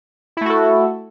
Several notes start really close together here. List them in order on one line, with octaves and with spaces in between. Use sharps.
E4 A3 F#4 A4